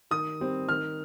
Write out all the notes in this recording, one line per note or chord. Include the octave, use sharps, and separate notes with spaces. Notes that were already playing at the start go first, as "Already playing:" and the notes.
D#3 D#6
G3 C4
D#3 F6